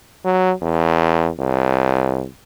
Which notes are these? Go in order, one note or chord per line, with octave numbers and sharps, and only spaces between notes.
F#3
E2
C2